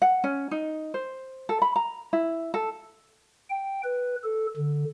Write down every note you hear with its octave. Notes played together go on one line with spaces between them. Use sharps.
F#5
C#4
D#4
C5
A4
B5
A#5
E4
A4
G5
B4
A4
D3